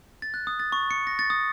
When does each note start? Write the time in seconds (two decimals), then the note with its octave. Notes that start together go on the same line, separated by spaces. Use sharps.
0.22 A6
0.34 F#6
0.47 D#6
0.60 A6
0.72 C#6
0.91 C#7
1.07 A#6
1.19 A6
1.30 D#6